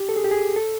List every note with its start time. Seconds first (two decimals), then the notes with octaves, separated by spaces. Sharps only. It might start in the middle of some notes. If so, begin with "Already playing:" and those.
Already playing: G4
0.09 A4
0.16 G#4
0.24 G4
0.31 G#4
0.56 A4